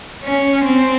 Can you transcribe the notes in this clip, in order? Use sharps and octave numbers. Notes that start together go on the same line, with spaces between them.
C#4
C4